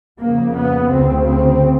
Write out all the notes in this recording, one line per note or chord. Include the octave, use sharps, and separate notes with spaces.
F2 C#3 A#3
B3
D2 C#3 C4
C4